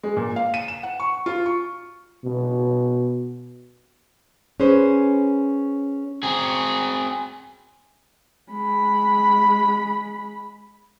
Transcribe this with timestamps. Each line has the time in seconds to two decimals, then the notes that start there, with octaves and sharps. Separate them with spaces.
0.03 G#3
0.17 A#2
0.36 F5
0.54 D#7
0.68 E7
0.83 F#5
1.00 C#6
1.26 F4
1.46 C#6
2.24 B2
4.60 C#4 G#4 B4 C5
6.23 C4 G#4
8.51 G#3 B5